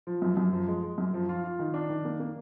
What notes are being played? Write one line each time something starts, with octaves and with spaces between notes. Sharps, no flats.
F3
F#2
F#2
F3
G#3
G#3
F#2
F3
F4
F4
D#3
D4
D#3
A#3
A#3